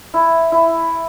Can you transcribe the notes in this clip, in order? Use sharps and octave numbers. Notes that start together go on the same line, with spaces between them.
E4
E4